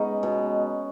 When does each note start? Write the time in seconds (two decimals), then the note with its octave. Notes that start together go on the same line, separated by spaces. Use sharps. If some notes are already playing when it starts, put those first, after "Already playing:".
Already playing: G#3 B3 C#4 D#4
0.23 B2